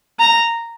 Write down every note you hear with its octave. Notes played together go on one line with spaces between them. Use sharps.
A#5